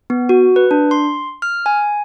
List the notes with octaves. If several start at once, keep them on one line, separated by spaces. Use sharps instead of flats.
B3
F#4
B4
D4
C6
F6
G#5